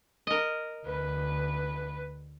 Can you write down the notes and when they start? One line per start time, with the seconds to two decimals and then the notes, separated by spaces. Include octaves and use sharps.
0.27 A#4 D#5
0.87 D2 B4